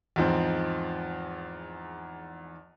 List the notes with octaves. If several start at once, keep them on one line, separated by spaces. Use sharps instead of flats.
E2 G#2 F3 C4